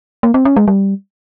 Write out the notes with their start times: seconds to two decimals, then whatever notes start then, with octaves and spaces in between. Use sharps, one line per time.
0.23 A#3
0.34 C4
0.45 C#4
0.56 G#3
0.68 G3